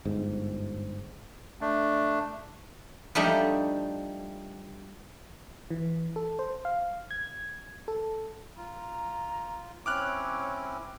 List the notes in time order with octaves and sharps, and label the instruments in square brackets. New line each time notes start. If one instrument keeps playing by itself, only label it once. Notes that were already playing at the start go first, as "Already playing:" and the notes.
[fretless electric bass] G1 G#2
[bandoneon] A3 D4
[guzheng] F3 G3 A3 D4 D#4
[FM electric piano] E3
A4
C5
F5
G#6
A4
[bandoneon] F4 [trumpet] A#5
[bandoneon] C4 C#4 E4 [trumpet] C#5 [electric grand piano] D6 F6 F#6